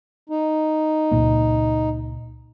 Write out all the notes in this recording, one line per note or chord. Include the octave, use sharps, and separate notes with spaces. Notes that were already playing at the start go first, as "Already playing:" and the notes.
D#4
C#2 A#2 A#3